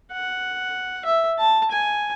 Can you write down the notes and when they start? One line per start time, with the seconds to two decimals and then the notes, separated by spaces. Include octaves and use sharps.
0.13 F#5
1.05 E5
1.39 A5
1.71 G#5